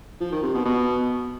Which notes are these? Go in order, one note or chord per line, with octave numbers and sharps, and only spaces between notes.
F3
D#3
C3
B2
B2